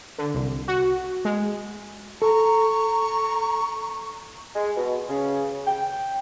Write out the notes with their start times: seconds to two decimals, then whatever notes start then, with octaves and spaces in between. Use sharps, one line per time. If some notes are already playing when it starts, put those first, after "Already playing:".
0.18 D3
0.34 C2
0.68 F#4
1.25 G#3
2.22 A4 A#5 C#6
4.55 G#3
4.76 B2
5.09 C#3
5.67 G5